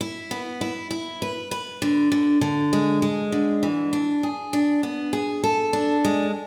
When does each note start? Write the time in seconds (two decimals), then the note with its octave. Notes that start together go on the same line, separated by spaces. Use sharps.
0.01 E4
0.31 B3
0.61 E4
0.91 E4
1.22 B4
1.51 B4
1.82 D3
2.12 D3
2.41 D3
2.73 G#3
3.02 G#3
3.32 D3
3.63 E3
3.93 D4
4.23 G#4
4.53 D4
4.83 B3
5.13 G#4
5.44 A4
5.73 D4
6.05 G#3